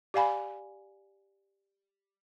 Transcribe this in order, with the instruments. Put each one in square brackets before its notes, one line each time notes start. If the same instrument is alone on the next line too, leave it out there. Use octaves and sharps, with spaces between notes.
[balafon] G4 D5 F5 G#5 B5